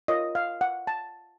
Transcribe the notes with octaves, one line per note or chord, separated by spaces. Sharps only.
F4 A#4 C#5 D#5
F5
F#5
A5